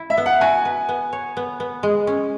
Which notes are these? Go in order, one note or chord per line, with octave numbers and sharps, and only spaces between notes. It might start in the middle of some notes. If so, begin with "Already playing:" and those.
Already playing: E4
E5
B3
F#5
F#4 G#5
B4
B3
C#5
B3
B3
G#3
C#4